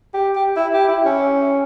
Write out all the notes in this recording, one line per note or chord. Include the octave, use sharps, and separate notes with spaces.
G4
G4
E4
G4
E4
C#4